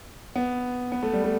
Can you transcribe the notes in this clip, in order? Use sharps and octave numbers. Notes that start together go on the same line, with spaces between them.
B3
B3
A3
G3
A3